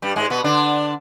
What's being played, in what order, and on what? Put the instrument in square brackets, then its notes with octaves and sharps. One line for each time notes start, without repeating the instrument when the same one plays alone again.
[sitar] G2 G3
G#2 G#3
B2 B3
D3 D4